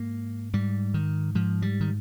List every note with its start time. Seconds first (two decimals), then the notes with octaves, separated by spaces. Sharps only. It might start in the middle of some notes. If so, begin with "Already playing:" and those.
Already playing: G#2 A#3
0.53 G#2 G3
0.94 D#3
1.35 G#2 F3
1.62 G3
1.81 D#3